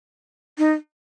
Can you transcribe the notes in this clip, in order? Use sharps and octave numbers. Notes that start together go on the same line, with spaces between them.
D#4